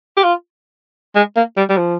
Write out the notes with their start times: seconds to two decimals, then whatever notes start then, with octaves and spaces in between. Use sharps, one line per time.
0.17 G4
0.24 F4
1.16 G#3
1.36 A#3
1.57 G3
1.69 G3
1.77 F3